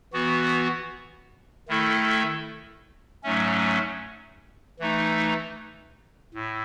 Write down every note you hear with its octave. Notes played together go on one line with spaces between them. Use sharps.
E3 B3 F#4
D#3 A3 E4 A4
G#2 F#3 A3 C#4
E3 A3 D#4
A2